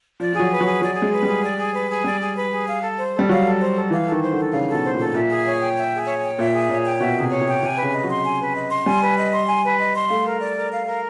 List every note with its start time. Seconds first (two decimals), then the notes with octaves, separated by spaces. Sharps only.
0.20 F3 D5
0.33 F3 G#4
0.39 F#3
0.51 B4
0.61 F#3
0.66 G#4
0.82 F#3 D5
0.96 G#4
1.02 G#3
1.12 B4
1.23 G3
1.28 G#4
1.43 D5
1.58 G#4
1.74 B4
1.90 G#4
2.04 G3 D5
2.21 G#4
2.35 B4
2.51 G#4
2.66 F5
2.82 A4
2.97 C5
3.13 A4
3.19 G3
3.29 F#3 F5
3.44 A4
3.59 C5
3.75 A4
3.90 E3 F5
4.06 A4
4.12 D#3
4.22 C5
4.33 D3 A4
4.52 C#3 F5
4.68 A4
4.73 B2
4.83 C5
4.94 A#2
4.99 A4
5.14 A#2 E5
5.30 G#4
5.45 C#5
5.61 G5
5.76 E5
5.92 G#4
6.07 C#5
6.22 G5
6.38 A#2 E5
6.53 G#4
6.69 A#2 C#5
6.85 G5
7.00 B2 E5
7.16 C3 G#4
7.31 C#5
7.41 C3 G5
7.62 C3 G#5
7.77 B4
7.83 C#3
7.93 D#5
8.04 F#3
8.09 C6
8.24 G#5
8.40 B4
8.55 D#5
8.70 C6
8.85 G3 G#5
9.02 B4
9.17 D#5
9.32 C6
9.47 G#5
9.63 B4
9.78 D#5
9.94 C6
10.09 A3 F5
10.25 A#4
10.40 D5
10.56 A#4
10.72 F5
10.87 A#4